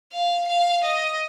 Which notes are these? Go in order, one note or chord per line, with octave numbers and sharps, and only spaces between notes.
F5
F5
D#5